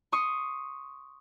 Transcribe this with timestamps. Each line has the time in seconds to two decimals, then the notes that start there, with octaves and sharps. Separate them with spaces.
0.12 C6 C#6 D#6